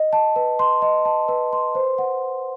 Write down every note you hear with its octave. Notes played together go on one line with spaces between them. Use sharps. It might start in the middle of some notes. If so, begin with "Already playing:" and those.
Already playing: D#5
A5
B4
C6
D#5
A5
B4
C6
C5
F#5